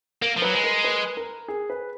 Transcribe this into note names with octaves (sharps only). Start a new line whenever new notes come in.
A#3 A#4
F3
F#3 B4
G#3
A#4
B4
A#4
G#4
B4